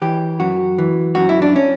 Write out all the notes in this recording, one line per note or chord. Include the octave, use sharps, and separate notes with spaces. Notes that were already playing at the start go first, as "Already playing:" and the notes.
E3 G4
F#2 F#4
E3
F#2 F#4
E4
D4
C#4